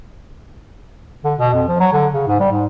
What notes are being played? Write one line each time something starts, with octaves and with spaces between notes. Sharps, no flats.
D3
B2
F2
F3
F#3
D3
C#3
G#2
G3
G#2